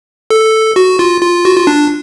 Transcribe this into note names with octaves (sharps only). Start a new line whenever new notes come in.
A4
F#4
F4
F4
F#4
F4
D4